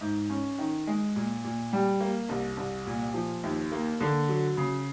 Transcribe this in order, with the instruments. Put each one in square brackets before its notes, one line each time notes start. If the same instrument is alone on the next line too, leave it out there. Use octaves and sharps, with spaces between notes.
[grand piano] G#2
C#4
D#3
G#3
A#2
A#2
G3
A#3
C2
C2
A#2
F3
D#2
A#3
D3
F#3
C#3